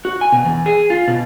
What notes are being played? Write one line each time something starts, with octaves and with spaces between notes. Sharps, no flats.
F#4
G#5
B2
E2
G#4
F4
B2